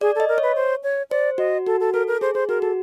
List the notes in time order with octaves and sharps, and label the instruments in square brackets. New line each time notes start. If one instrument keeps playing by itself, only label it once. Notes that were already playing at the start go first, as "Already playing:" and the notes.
[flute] G#4 [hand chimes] D5
[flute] A4 [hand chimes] D#5
[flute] A#4
[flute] B4 [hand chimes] C#5
[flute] C5
C#5
[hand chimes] C5 [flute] D5
[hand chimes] F#4 [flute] D#5
[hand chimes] F#4 [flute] A4
[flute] A4
[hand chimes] A4 [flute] A#4
[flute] A#4
[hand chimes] G#4 [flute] C5
[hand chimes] G#4 [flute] C5
[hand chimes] F#4 [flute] A#4
[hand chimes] F#4 [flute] A4